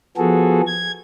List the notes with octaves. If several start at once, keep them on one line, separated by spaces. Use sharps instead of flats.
F3 B3 F#4 G#4 A4
G#6